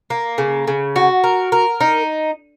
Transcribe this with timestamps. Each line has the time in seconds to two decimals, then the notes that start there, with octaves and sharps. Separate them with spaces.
0.10 A#3
0.38 C#3
0.67 C#3
0.96 F#4
1.24 A#4
1.52 A#4
1.81 D#4